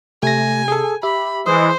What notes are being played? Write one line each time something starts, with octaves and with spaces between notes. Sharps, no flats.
C3 A3 G#5 A#6
G#4 A4
G4 E5 B5
E3 G#3 C5 D#6